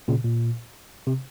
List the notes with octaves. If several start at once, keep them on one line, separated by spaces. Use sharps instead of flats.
A#2 C#3
A#2
C3